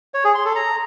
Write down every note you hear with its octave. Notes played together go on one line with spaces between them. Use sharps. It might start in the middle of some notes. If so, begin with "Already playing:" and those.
C#5
G#4
C6
A4
A#5